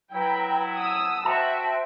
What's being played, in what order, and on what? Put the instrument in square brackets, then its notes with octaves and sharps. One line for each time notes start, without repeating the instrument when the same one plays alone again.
[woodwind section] F#3 E4 [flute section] B4 A#5 B5 [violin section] G5
[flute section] F#5 A5 [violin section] D#6 E6
[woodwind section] F#4 [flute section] C5 G5 [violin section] E5 [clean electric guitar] A5